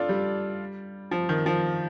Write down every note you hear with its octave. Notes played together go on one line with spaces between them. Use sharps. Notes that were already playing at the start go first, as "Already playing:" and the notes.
Already playing: D4 F4 A4
G3
F3
D#3
F3